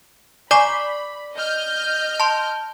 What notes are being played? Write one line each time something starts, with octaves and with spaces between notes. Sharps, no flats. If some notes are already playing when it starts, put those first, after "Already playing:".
D5 G#5 A#5 B5 C#6 D6 C7
D#5 F6 G6
A5 C6